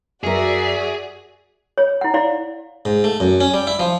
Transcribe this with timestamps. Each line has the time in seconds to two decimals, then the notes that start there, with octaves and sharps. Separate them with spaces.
0.24 F#2 F#4 G#4 A#4 D5 E5
1.78 C#5
2.01 E4 F#5
2.14 E4 D5 F5
2.85 G#2
3.04 A3
3.20 F#2
3.40 C#4
3.54 G3
3.67 E4
3.79 F3